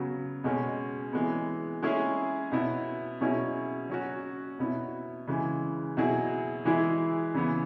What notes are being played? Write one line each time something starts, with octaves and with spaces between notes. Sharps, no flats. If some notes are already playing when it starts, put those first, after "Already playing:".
Already playing: C#3 F#3 B3
B2 G#3 C#4
E3 G#3 B3
G#3 C#4 E4 G#4
B2 B3 E4
B2 F#3 C#4 E4 G#4
F#3 C#4 F#4
B2 B3 E4
C#3 E3 G#3
B2 F#3 E4 G#4
E3 G#3 E4 G#4
C#3 E3 B3